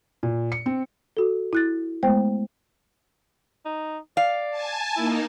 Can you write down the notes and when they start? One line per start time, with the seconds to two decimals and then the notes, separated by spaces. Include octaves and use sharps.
0.23 A#2
0.52 C#7
0.66 C4
1.17 F#4 A4
1.53 E4 F#6 A6
2.03 G#3 A3 B3 C5 G5
3.65 D#4
4.17 D5 F5
4.50 G#5 A5
4.97 A#3 D#4 E4